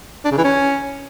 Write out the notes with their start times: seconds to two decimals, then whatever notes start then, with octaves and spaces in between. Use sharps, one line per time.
0.25 D4
0.31 C#3
0.38 E3
0.44 C#4